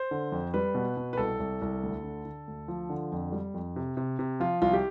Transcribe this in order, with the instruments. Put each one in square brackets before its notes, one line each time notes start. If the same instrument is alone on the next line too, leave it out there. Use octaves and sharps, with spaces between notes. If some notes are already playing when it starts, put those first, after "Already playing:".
Already playing: [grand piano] C5
D3
F2
G3 B4
B2
B2
B4
C2 A4
C2
C2
D2
D3
D3
D2
F3
D3
F2
G3
F2
C3
C3
C3
F3 F4
C2 F4
G4